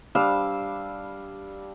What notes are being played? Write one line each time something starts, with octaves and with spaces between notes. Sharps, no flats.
G3 D4 F5 E6